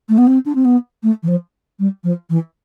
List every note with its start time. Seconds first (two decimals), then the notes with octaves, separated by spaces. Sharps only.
0.09 A3
0.18 B3
0.27 C4
0.46 D4
0.55 C4
0.65 B3
1.03 A3
1.23 E3
1.28 F3
1.79 G3
2.04 F3
2.30 E3